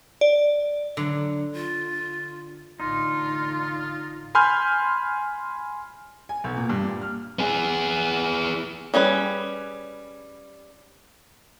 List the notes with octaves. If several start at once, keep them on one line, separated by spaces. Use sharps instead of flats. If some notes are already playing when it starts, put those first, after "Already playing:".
D5
D3 F#3
F4
A1 D3 D#4 F4 C6
G#5 B5 C6 F6 G6
G#5
B1
A#2
G2
A#2
F6
B3 G#4
G3 C#4 G#4 B4